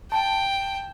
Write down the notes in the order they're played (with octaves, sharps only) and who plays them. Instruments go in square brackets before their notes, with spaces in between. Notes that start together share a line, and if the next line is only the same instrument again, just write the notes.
[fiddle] G5 [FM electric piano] A5